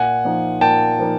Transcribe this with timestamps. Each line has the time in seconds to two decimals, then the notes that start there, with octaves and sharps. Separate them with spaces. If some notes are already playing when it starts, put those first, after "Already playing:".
Already playing: A#2 F#5 G#5
0.25 F3 A#3 D#4
0.61 A#2 G5 A5
0.98 F3 A#3 D#4